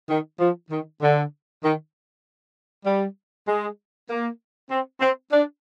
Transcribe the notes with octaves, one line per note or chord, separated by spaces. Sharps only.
D#3
F3
D#3
D3
D#3
G3
G#3
A#3
C4
C4
D4